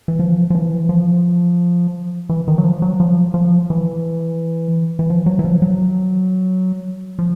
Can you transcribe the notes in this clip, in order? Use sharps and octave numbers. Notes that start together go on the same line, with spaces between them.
E3
F3
F3
E3
F3
E3
D#3
F#3
F3
F#3
F3
F3
E3
E3
F3
F#3
E3
F3
F#3
F3